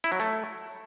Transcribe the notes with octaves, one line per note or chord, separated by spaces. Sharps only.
E4
F#3
A3